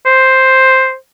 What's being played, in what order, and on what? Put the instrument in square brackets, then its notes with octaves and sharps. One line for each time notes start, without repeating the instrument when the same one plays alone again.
[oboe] C5